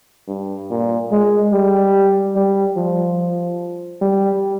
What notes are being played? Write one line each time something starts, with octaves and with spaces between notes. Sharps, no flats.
G2
A#2
G#3
G3
G3
F3
G3